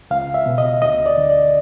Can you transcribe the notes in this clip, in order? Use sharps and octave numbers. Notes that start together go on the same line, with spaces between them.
C#2 F5
E5
B2
D#5
D2 D#5
D5
D3
D5